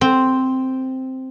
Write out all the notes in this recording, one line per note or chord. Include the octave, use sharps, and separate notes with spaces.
C4